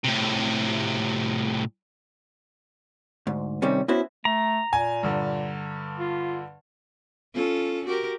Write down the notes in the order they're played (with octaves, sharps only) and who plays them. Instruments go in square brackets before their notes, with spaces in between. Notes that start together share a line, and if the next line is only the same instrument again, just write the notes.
[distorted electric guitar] A2 C3
[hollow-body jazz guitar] D2 G#2
C3 D#3 G3 C#4
B3 C#4 E4 F#4 C5
[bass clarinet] A3 [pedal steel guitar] A#5
[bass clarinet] A#2 [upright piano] G#5
[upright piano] G2 D3
[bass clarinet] F4
[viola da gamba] C#4 F4 A4
F#4 G4 A#4